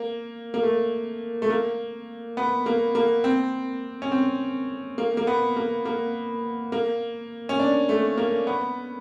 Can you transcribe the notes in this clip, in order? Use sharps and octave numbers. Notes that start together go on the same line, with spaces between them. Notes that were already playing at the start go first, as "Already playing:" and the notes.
Already playing: A#3
A#3
A3
A3
A#3
B3
A#3
A#3
C4
C#4
C4
A#3
A#3
B3
A#3
A#3
A#3
C#4
D4
A3
A#3
B3